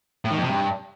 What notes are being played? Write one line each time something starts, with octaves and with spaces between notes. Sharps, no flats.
A2
D#3
F2
C3
G2